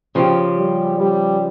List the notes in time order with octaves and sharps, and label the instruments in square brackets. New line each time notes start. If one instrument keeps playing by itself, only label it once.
[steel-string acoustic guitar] C#3 F3 C#4 G4
[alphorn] G3
G3